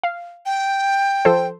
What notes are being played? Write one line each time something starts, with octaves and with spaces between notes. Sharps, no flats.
F5
G5
F3 A4 C5